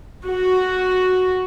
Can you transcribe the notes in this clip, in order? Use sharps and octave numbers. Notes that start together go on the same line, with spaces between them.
F#4